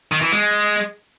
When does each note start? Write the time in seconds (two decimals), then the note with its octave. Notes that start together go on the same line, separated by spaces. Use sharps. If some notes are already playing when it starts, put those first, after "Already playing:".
0.12 D#3
0.22 E3
0.32 G#3